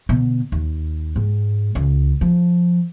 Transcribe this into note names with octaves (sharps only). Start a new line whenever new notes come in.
B2 D3
D#2
G#2
C#2
F3